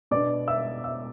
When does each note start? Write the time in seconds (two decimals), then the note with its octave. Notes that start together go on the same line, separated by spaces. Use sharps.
0.11 B2 B3 D4 D5 D6
0.48 E5 E6
0.84 E5 E6